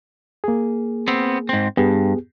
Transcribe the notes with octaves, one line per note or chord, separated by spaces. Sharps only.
A#3 G#4
B3 C4
G#2 C4
G2 B3 G4 G#4